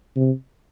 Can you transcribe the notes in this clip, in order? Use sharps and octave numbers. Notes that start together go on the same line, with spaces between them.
C3